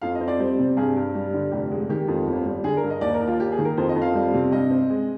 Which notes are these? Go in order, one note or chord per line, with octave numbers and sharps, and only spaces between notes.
F2 F5
D#5
C4
D5
G3 C5
C3
G2 G#4
G2
G3
D3
F1 G4
G#3
D#3 G4
F2
G1
G3
D3 G#4
A#4
G2
D#5
D#2 D5
A#4
D#2
F4
A#3 G4
G#4
D#3
A#4
F2 C5
D#5
F2
F5
G3
C3
G2 D#5
C4
G#3